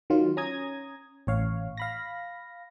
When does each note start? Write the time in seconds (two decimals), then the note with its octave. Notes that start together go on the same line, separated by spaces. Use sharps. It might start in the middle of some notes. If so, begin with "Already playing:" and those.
0.10 D#3 F#3 F4
0.37 C#4 A#5 D#6 G#6
1.27 A1 C#5 F5
1.77 F5 B5 A#6